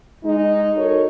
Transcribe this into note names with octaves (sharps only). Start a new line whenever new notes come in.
G#3 D#4
F#4 A4 A#4 C#5